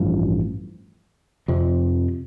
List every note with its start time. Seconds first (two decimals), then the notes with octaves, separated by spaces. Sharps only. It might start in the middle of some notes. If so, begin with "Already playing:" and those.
Already playing: A1 G2 F3
1.48 F2 C3 F3